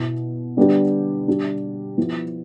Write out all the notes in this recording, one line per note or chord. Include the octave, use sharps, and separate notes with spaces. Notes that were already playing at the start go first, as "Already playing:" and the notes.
Already playing: B2 B3 E4
D3 G3 B3 D4 G4
G3 D4 G4
F3 B3 E4